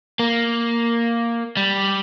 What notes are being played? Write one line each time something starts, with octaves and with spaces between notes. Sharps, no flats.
A#3
G3